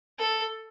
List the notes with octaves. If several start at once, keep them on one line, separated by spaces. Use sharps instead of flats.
A4